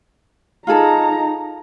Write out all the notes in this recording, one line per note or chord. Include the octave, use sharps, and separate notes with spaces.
D#4 F4 G#4 A4 A#5